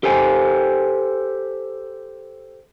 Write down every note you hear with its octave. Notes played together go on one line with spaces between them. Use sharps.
G4 A4 C5 G#5